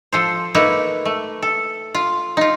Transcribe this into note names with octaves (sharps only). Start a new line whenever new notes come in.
F3 A4 C5
A3 A#3 D#4 A4 B4
A3
A4
F4
D#4 F4